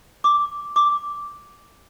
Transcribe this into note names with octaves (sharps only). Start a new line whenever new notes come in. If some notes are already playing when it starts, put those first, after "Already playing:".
D6
D6